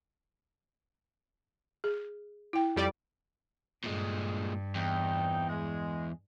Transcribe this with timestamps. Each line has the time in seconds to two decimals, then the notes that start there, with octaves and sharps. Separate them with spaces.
1.84 G#4
2.53 E4 G5
2.76 F2 G3 D5
3.84 G2 A#2 G#3
4.75 E2 C4 D#4 G5
5.50 G#3